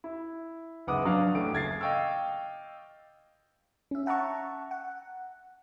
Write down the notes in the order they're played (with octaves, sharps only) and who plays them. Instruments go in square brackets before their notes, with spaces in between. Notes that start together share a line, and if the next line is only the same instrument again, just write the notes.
[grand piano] E4
F#1 G#2 B3 F#5 D6 D#6
F#3 D4 F5
A1 A3 D7
F#1 G#6 A6 C7
D#5 F5 G5 C#6 E6
[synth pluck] C#4 E5
E5 F#5 A5 A#5 C#6
F#5